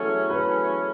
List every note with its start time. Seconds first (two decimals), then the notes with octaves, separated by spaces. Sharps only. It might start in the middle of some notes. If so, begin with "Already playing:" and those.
Already playing: E2 C#3 F#3 A3 C#4 A4
0.30 B4